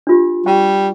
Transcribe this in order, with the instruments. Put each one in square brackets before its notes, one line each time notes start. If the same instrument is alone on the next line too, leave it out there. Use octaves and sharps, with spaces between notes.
[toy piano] D4 F4 G4
[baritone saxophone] G3 [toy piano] G5 C#6